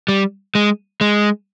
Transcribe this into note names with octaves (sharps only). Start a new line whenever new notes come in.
G3
G#3
G#3